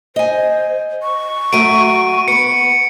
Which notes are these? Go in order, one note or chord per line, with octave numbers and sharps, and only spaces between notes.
C5 D#5 G#5
C#6
F#3 A3 D7 D#7
B3 B4 C#7